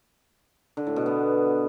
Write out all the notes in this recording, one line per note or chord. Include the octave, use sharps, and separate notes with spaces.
D3
A2
B2
B3